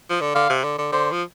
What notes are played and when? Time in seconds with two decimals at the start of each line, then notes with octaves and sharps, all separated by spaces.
0.10 F3
0.21 D3
0.35 D3 F5
0.50 C3
0.64 D3
0.78 D3
0.92 D3 C5
1.12 F3